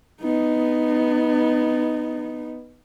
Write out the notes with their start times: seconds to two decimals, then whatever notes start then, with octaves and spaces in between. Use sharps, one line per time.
0.23 B3 D#4